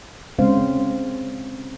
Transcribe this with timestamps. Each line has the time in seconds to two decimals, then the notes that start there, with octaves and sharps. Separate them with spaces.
0.39 C#3 G#3 C4 C#4 C5 F5